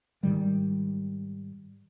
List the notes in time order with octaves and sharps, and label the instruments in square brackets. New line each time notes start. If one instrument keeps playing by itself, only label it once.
[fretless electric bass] G#2 D#3 G3